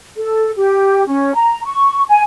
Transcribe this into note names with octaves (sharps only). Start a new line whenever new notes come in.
A4
G4
C#4
A#5
C#6
G#5